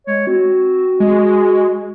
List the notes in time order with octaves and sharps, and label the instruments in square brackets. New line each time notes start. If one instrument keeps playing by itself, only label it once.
[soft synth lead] G#3 [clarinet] C#5
[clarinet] C4 [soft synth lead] F#4
[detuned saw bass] G#3 [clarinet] D#5